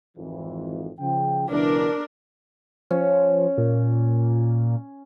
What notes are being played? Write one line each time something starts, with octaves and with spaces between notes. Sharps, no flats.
G#1 F2 E3
C#3 F3 G5
C#2 B2 E3 D4 A#4
F3 C#4
A#2